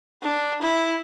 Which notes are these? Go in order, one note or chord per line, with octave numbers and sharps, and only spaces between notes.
D4
E4